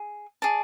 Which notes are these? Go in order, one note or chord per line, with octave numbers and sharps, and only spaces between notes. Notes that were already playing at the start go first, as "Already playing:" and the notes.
Already playing: G#4
G#4 D5 A5